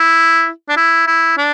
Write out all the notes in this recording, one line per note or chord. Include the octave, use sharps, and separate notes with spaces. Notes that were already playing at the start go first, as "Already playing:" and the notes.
Already playing: E4
D4
E4
E4
D4